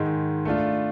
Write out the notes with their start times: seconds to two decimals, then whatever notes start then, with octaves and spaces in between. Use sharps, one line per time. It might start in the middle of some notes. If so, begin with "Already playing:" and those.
Already playing: G#2 D#3 G#3
0.45 A3 D4 F4